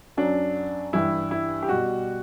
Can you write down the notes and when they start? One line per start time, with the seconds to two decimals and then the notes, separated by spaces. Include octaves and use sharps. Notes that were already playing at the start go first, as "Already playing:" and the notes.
0.17 F#2 F#3 D4
0.93 G2 E3 G3 E4
1.31 E4
1.63 G4
1.69 B2 G3 F#4